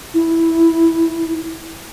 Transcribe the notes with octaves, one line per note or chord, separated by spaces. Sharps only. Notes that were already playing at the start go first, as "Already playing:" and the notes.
E4